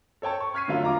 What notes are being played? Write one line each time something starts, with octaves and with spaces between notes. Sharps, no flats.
A4 C#5 G5 A5
C#6
C#6 F6 G#6 B6 C7 D#7
A2 D3 F#3 F4 A4
E1 F4 A#5 D6